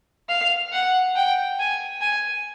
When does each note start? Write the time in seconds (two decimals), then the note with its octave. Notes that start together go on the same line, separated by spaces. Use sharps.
0.29 F5
0.72 F#5
1.15 G5
1.59 G#5
2.01 G#5